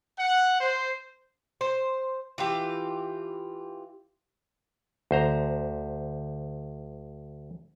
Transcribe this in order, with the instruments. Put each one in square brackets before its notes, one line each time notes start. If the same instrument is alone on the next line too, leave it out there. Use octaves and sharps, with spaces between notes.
[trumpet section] F#5
C5
[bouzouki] C5
E3 F4 G4
[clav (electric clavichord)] D2 C5 A#5